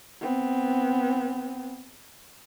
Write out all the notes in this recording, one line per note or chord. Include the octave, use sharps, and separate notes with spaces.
B3 C4